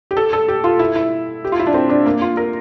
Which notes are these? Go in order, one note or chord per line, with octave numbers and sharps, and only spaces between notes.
G4
A4
A4
G4
F4
E4
E4
G4
F4
E4
D4
C4
D4
A#3
F4
A#4